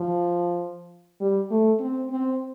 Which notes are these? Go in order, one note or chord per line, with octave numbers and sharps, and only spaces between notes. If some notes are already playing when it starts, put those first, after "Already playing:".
Already playing: F3
G3
A3
C4
C4